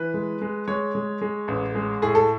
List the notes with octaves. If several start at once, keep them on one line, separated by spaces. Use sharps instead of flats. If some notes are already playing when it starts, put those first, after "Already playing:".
Already playing: E3 B4
G#3
G#3
G#3 C#5
G#3
G#3
A1
G#3
A2 G#4
A4